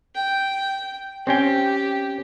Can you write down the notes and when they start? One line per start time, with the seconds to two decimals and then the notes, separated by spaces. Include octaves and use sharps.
0.15 G5
1.27 C4 C#4 G4 G5